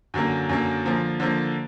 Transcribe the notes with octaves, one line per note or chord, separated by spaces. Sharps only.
F#2 D3 F#3 A#3
F#2 D3 F#3 A#3
D3 F3 A#3
D3 F3 A#3